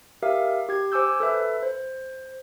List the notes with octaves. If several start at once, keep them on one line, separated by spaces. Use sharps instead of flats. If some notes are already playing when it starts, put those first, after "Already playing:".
G4 A#4 E5 F5
G4 G#6
C5 G#5 D6 E6 G6
A4 B4 E5
C5